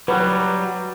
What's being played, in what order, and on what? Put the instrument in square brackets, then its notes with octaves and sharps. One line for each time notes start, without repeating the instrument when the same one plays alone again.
[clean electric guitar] F#3 G3 [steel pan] B4